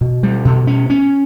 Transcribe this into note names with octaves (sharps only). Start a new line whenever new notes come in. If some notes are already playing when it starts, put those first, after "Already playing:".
B2
G3
B2
C#4
C#4